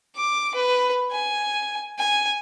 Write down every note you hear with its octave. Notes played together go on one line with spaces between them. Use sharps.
D6
B4
G#5
G#5